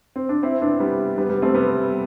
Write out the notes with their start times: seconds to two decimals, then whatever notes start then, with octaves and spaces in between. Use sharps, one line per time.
0.16 C4
0.29 D4
0.43 C4 E4
0.62 B3 D4
0.80 G3 B3
1.18 G3 B3
1.29 G3 B3
1.42 A3 C4
1.55 G3 B3